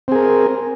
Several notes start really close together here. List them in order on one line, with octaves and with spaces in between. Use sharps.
C4 G#4 A#4